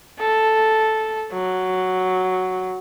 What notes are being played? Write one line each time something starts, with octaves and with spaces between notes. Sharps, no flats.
A4
F#3